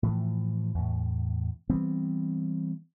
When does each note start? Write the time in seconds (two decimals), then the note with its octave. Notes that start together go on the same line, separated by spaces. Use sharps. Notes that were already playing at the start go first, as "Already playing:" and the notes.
0.03 A2 E3 F3
0.74 E2 A2
1.69 E3 G3 B3 C4